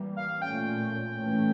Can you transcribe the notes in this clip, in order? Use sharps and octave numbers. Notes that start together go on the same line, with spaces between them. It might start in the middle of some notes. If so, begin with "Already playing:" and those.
Already playing: E3 G3 A#3
F5
A#2 A3 C#4 G5
A2 E3 A3 C#4